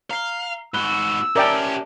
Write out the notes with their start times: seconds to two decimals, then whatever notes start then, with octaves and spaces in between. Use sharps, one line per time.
0.10 F5 A#5 C7 G7
0.74 G#2 F#4 B5 E6 F#6 G7
1.36 C#4 G4 A#4 D5 E5 G5 A5